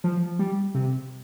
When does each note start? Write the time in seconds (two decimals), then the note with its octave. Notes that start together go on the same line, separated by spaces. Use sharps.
0.04 F3
0.39 G3
0.75 C3